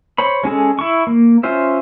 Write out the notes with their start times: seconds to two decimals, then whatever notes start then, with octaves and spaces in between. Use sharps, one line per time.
0.18 C5 C#5 B5
0.43 G#3 C#4 G#4 A4
0.79 E4 C#6
1.07 A#3
1.43 C#4 F4 C5 E5